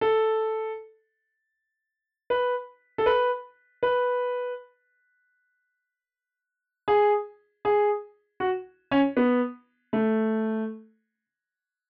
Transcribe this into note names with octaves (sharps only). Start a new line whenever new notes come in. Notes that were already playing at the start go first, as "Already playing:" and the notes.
A4
B4
A4
B4
B4
G#4
G#4
F#4
C#4
B3
A3